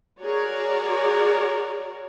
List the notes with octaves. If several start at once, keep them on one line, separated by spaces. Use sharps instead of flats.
F#4 G#4 A#4 C#5 D5